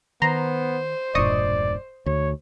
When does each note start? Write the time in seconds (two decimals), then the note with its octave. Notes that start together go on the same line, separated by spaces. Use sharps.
0.22 D#3 B3 C5 A#5 C6
1.15 E1 G2 A#2 D5 D#5 C#6 D#6
2.06 D2 C#5